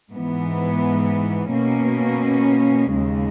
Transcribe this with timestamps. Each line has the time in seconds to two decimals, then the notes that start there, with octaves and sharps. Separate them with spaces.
0.11 G#2 E3 B3
1.53 B2 A#3 C#4
2.95 D#2 C#3 G#3